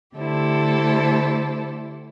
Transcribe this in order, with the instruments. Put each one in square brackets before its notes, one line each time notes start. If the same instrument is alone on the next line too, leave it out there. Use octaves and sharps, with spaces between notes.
[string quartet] D3 A3 E4 G4 A4 C5